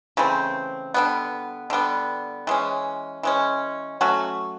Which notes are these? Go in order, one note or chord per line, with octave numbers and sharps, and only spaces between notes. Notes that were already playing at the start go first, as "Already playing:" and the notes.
C#3 E3 A3 C4
D3 G3 B3
D3 G3 B3
E3 G#3 C#4
E3 G#3 C#4
F#3 A3 C#4 F#4